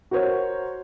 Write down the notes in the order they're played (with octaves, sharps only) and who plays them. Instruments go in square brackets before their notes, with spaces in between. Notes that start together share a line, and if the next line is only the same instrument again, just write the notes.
[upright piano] F#4 A#4 C5 C#5